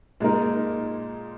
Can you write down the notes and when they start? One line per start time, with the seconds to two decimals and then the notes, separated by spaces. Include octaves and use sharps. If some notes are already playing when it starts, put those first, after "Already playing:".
0.20 A#2 G#3 D#4 A#4